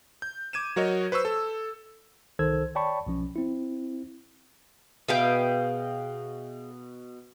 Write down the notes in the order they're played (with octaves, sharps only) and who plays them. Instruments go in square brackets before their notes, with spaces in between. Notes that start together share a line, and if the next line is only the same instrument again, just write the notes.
[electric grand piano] G6
D6 G#6 D#7 E7
F#3 F#4 A#4 C#5 D#5
B4 C5 C#6 E6
A4
[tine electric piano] C2 D#3 A4 C5 E6 G#6
C#5 D5 G5 A5 B5 C#6
B1 F3 C#4
C4 E4
[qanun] B2 E5 B5 [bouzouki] G#4 F5 G5